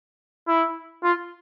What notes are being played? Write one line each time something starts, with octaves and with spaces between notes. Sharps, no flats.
E4
F4